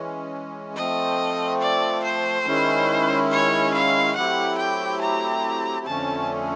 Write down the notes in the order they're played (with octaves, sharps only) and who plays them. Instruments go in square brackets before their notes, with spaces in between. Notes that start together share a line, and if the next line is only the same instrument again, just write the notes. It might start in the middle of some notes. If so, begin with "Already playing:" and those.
Already playing: [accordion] E3 G#3 C#4
[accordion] F3 A3 C4 [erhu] D#5
[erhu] D5
C5
[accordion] D#3 G#3 C#4 E4
[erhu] C#5
F5
[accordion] F#3 A3 C4 E4 G4 [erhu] F#5
[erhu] G5
A#5
[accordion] F2 D3 F3 A3 C#4 [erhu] A5